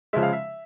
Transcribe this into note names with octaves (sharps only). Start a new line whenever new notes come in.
C#3 F3 G#3 E5
F5
E5